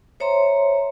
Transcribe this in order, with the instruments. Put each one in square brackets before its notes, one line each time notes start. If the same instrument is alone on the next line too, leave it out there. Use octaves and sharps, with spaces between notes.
[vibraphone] C5 C#5 E5 A#5 C6